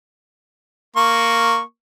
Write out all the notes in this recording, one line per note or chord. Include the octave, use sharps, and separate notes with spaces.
A#3 C#6